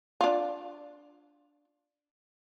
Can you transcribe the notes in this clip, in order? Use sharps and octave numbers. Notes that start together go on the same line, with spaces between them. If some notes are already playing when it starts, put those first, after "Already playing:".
D4 F4